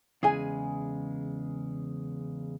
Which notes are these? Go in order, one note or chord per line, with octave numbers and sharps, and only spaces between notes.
E2 C#3 G#3 G#4 G#5